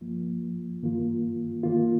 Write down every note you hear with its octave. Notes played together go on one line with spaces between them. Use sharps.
G2 F3 A#3 F4
G2 D#3 A#3 F4
D#3 A#3 F4